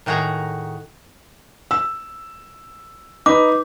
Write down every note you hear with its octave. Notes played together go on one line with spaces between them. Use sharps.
A2 D#3 F#4 G#4 A#5
E6
D#4 B4 D6